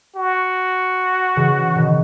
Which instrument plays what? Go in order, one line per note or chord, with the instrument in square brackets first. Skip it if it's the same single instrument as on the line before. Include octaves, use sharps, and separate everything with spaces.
[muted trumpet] F#4
[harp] C#3 E3
B2 D#3